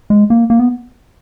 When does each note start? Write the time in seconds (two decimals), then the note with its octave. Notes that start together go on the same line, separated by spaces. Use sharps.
0.10 G#3
0.30 A#3
0.50 A#3
0.59 B3